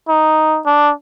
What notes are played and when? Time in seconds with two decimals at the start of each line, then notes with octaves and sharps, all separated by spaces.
0.08 D#4
0.66 D4